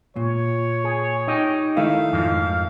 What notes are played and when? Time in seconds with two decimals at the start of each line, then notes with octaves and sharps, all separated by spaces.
0.16 A#2 C#5
0.84 G#4
1.27 D#4 G4
1.77 D#3 A3 E4 F5
2.12 F2 G#2 F3